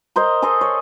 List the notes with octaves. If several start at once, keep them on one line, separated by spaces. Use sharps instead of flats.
A#4 C5 D#5
G#4 A4 C5 D#5
C#5